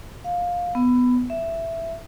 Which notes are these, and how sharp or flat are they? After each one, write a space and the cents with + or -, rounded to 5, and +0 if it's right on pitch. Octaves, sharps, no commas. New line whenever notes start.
F5 +15
B3 +10
E5 +10